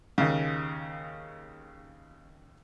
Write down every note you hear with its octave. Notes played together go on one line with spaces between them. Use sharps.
D#2 C#3